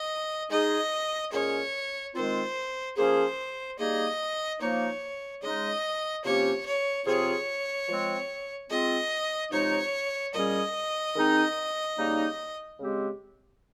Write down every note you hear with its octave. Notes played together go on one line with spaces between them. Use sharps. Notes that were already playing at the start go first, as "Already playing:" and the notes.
Already playing: D#5
G#3 D#4 G#4 D#5
A#2 G#3 C#4 G#4 C#5
D#3 G#3 C4 F4 C5
F3 A#3 C#4 G#4 C5
G3 A#3 D#4 G#4 D#5
F3 A#3 D#4 C#5
C#3 G#3 D#4 D#5
C3 F3 A#3 C#4 G4 C#5
C#5
C3 F3 C4 F4 G#4 C#5
F3 G#3 C4
G#3 C4 F4 D#5
C3 F3 G#3 D#4 C#5
A#2 G3 C#4 G#4 D#5
D#3 G#3 C4 D#4
C#3 G3 A#3 D#4
C#3 G#3 C4 G4